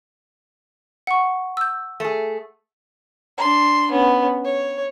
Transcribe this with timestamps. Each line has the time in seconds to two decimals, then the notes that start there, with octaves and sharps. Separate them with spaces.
1.07 F#5 C#6
1.57 E6 G6
2.00 A3 G#4
3.38 D4 C6
3.91 B3 C#4
4.44 C#5